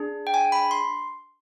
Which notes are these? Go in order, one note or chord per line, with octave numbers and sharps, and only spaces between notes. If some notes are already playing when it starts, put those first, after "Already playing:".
Already playing: D4 G#4
G5
G#5
B5
C6